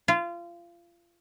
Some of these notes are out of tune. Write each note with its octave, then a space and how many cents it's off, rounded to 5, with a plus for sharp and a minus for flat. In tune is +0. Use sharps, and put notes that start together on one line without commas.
F4 -25